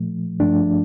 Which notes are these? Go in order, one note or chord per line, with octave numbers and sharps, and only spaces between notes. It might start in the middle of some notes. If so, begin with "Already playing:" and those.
Already playing: A#2 F3 A3
G2 F3 A3 D4